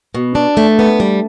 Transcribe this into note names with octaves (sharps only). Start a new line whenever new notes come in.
B2
D4
A3
B3
G3